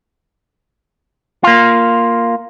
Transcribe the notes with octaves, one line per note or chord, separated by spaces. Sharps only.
A#3 F4